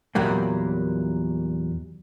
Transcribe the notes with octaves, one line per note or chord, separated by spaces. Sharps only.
E2 A#2 F#3 G3 A#3